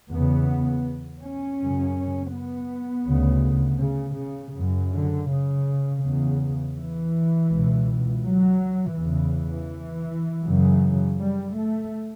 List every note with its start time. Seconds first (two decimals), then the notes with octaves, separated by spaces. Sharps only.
0.11 E2 C#3 B3
1.22 C#4
1.60 F#2 C#3
2.34 B3
3.07 D2 C#3
3.81 C#3
4.18 C#3
4.54 F#2 C#3
4.92 D3
5.29 C#3
6.03 E2 C#3
6.76 E3
7.50 C#2 B2
8.25 F#3
8.97 E2 C#3 E3
10.45 F#2 C#3
11.20 G3
11.57 A3